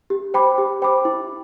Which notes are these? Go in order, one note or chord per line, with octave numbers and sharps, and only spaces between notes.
G4
C5 G5 B5 D6
G4
C5 G5 B5 D6
E4